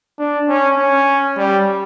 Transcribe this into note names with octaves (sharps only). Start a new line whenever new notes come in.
D4
C#4
C#4
G3